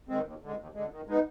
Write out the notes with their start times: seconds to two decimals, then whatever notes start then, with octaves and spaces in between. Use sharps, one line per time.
0.09 D#3 G#3 C4
0.24 D#2
0.42 D3 G#3
0.58 D#2
0.74 D3 G#3
0.91 D#3
1.07 G#3 B3 D#4